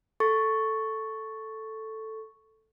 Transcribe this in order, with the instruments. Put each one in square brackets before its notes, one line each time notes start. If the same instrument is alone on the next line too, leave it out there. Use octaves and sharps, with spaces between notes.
[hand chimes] A4 C#6 A6